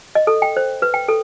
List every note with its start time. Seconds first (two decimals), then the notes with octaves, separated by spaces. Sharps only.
0.15 D#5
0.27 A4
0.42 G5
0.57 C5
0.82 B4
0.94 G5
1.08 A4